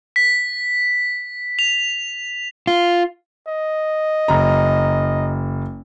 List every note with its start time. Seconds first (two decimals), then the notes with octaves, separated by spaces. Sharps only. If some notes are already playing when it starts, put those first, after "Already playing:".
0.16 B6
1.59 F7
2.67 F4
3.47 D#5
4.28 F#1 A#5